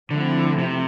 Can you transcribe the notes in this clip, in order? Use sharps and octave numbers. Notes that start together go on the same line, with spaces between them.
D3 F3 A3 C4 E4
C3